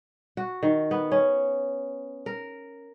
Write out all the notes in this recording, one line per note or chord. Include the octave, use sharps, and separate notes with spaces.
F#4
D#3
B3
C#4
A#4